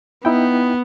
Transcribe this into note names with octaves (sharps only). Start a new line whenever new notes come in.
B3 D#4 E4 G5